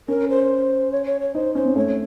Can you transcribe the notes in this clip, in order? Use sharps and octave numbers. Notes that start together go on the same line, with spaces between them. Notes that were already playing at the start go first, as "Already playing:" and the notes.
C#4 A#4
C5
C#5
C#5
C#5
D#4 C5
C#4 C5
C4
A3 C#5